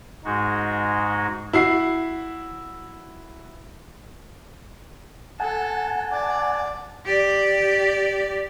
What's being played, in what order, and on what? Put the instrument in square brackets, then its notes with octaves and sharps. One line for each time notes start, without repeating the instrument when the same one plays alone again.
[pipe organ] G#2 G#3 D#4 F#4
[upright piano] E4 F#4 C7
[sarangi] A4 [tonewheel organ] F#5 G#5 A5
[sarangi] D5
[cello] G4 D5